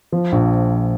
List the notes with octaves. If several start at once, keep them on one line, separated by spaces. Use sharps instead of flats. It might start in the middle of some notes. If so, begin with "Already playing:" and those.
F3
A#1